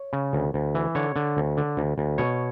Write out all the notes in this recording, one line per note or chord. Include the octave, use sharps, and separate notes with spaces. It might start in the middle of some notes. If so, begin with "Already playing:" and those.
Already playing: C#5
C#3
D2
D2
E3
D3 C#5
D3
D2
D3
D2
D2
B2 C#5